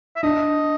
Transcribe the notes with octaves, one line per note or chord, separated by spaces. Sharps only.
E5
D4 D#5